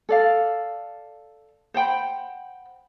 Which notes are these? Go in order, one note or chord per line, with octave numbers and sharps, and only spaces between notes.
A4 D5 F5
C5 F#5 G5 B5